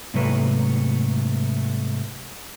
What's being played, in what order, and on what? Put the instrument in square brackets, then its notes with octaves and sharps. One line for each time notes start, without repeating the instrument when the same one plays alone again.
[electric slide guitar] G#2 C3 F#3 A3 A#3 B4